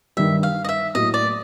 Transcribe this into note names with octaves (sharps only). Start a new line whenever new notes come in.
G2 D#3 G3 E5
F5
D#5
E5
A2 F#3 A#3 D#5
D5